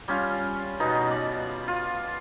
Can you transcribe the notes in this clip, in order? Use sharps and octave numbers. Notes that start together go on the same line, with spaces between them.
G3 C#4 F4
B2 B3 D#4
D5
F4